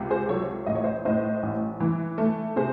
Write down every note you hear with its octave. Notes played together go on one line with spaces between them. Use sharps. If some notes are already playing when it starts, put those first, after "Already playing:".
Already playing: C#2 C3
G#4 C5
F#3 A4 C#5
A1 D#5
C#5
C5 D#5
A2 C5 D#5
A1
E3
A3
C3 G#4 C5